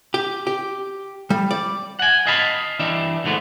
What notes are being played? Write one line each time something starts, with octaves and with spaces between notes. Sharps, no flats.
G4
G4
G3
D5
F#5 G#5
D#5 F5 A5 B5
E3 G3 D4 E5
C#2 G#2 D3 A3 B3